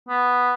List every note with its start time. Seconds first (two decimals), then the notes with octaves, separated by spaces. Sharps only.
0.09 B3